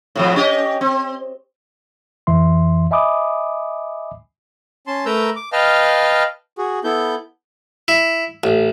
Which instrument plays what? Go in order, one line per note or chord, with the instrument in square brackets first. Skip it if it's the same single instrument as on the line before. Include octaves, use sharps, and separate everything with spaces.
[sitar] A2 C3 F3
C#4 G4 D#5
C4
[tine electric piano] F2 E3 E5 C6
D#5 E5 G#5 B5 D6 D#6
[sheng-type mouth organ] C#4 A5 C6
A3 A#4 B4 A#5 E6 G6
D6
B4 D#5 F5 G5 A5 F6
F#4 G#4
B3 E4 A4 G6
[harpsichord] E4
A1